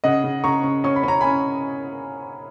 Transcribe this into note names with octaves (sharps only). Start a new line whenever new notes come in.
C#3 D#5 F#5
C#3
C#3 A#5 C#6
C#3
C#4 C#6
B5
C#4 A#5
C#4 G#5 B5